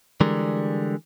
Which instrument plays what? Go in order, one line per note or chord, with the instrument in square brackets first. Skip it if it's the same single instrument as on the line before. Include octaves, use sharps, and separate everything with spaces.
[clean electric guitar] D3 E3 G3 G#3 A#4